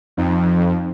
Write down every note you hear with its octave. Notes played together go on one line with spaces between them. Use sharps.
F2 F3 C4 D#4